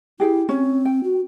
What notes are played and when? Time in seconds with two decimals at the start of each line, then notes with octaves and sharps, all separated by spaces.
0.20 E4 G4 G#4 G5
0.49 C4 C#4
0.85 G5
1.04 F#4